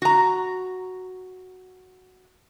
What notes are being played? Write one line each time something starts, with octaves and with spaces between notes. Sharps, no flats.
F#4 A#5